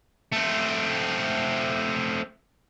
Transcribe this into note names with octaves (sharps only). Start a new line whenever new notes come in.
A3 C4